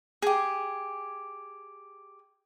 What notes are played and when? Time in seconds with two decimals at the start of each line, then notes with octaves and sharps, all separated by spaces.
0.22 G4 G#4